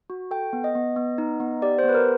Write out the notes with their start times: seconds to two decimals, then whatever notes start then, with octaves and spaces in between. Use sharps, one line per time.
0.10 F#4
0.31 A4 G5
0.53 B3
0.64 D#5
0.75 B3
0.96 B3
1.18 D#4
1.40 B3
1.62 G4 D5
1.79 C5
1.84 B3
1.89 B4
1.94 A#4